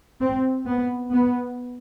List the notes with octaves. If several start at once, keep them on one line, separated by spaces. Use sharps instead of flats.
C4
B3
B3